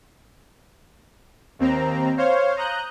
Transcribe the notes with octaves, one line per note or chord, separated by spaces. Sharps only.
D#2 C4 A#5
C5 C#5 F5
A#5 D#6 F#6 G6